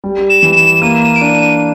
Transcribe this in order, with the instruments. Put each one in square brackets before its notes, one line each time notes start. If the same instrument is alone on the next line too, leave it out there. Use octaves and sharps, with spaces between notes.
[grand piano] G3
[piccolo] E7
[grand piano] E3
[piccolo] E7
[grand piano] A#3 [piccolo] D#7
[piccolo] E7
D7
[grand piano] D4 [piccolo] D#7
[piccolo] D#7